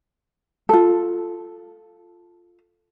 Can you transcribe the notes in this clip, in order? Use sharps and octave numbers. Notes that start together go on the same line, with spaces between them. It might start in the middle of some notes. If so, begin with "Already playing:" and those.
F4 A4